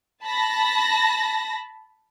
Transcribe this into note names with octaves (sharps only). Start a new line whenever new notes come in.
A5 B5 A#6